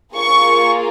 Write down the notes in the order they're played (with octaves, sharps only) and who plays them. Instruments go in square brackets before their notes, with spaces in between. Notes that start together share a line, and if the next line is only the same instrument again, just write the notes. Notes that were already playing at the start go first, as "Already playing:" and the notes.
[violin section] A#3 F4 G#4 C#6